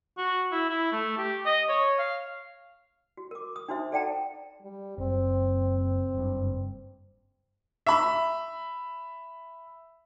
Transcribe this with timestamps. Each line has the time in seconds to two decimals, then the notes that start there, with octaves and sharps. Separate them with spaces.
0.18 F#4
0.52 E4
0.70 E4
0.92 A3
1.18 G4
1.46 D#5
1.69 C#5
1.99 F5
3.17 F#4
3.31 A#4 D6
3.56 D#6
3.68 D4 D#4 F#4 C5 E5
3.92 A4 D5 F#5 G5 A5 A#5
4.62 G3
4.98 F#1 C4
6.14 F#1 G2
7.87 E5 B5